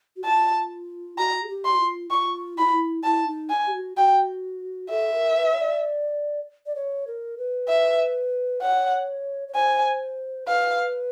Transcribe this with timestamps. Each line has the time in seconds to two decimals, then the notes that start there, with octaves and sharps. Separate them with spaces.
0.16 F#4
0.24 F4 A5
1.18 F#4 A#5
1.43 G#4
1.49 G4
1.65 C6
1.74 F#4
1.80 F4
2.10 F4 C#6
2.57 E4 B5
2.65 F4
2.71 E4
3.03 E4 A5
3.27 D#4
3.50 G#5
3.67 G4
3.74 F#4
3.97 F#4 G5
4.90 A4 E5
5.13 A#4
5.36 B4
5.53 C#5
5.59 D5
6.66 D5
6.76 C#5
7.07 A#4
7.38 B4
7.68 E5
8.62 C#5 F#5
9.48 C#5
9.55 C5 G#5
10.48 B4 F5